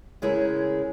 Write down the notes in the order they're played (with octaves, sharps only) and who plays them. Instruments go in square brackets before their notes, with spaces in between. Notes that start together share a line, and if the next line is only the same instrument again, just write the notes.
[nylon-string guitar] C#3 G#3 E4 G#4 A#4